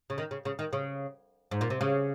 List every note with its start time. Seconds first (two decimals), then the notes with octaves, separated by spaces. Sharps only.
0.10 C#3
0.18 D#3
0.31 C#3
0.45 C#3
0.59 D#3
0.73 C#3
1.51 G#2
1.61 A#2
1.70 C3
1.81 C#3